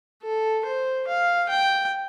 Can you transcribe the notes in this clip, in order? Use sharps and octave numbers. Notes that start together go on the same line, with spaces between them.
A4
C5
F5
G5